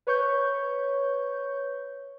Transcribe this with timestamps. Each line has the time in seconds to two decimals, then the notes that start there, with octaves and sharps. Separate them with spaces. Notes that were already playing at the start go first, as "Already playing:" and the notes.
0.07 B4 C#5 C#6 G6